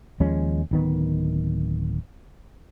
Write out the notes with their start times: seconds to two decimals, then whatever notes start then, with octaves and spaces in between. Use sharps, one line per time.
0.20 D#2 F3 G#3 C#4
0.71 D1 D#3 B3